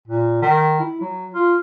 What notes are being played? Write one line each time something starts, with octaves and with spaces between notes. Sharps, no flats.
A#2
D#3
E4
F#3
F4